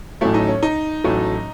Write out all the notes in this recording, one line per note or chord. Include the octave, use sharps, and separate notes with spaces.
A1 A2 F#3 A3 E4
D#4
C#4
D#4
A1 A2 F#3 A3